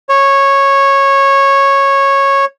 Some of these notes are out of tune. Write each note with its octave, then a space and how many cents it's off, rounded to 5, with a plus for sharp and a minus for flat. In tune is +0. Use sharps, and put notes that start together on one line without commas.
C#5 -10